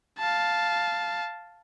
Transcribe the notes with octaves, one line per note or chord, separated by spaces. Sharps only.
F5 A5